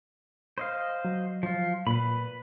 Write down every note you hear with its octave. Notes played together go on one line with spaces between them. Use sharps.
C5 D#5 F5
F#3
F3 F4
A#2 B4 B5